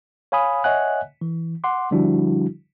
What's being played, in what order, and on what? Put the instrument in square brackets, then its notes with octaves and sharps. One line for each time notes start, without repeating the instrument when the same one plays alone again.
[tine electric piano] C#5 F5 G#5 B5 D#6
C#5 D#5 E5 F#5 G#5 F#6
E3
F#5 C6 D6
D3 F3 G3 D4 E4 F#4